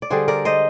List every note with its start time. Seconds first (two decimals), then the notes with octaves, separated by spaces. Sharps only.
0.02 D5
0.10 D3 G3 G#4 C5
0.28 A#4 D5
0.45 C5 D#5